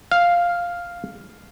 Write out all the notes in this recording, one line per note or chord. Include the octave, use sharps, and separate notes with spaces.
F5